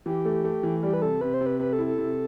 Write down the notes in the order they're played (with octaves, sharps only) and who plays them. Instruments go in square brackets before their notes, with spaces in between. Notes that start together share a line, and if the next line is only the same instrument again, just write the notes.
[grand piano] E3 [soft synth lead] G4
[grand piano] A3
A3
E3
[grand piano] G3 [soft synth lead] G4
[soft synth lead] B4
[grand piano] C3 [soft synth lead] A4
[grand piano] C3 [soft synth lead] B4
[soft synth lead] C5
[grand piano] C3
[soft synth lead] B4
[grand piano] C3 [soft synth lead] B4
[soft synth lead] A4
[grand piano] E4
[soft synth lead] A4
[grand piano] C3